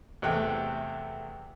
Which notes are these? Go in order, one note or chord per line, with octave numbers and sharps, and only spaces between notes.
E2 C3 A3 G5 F#6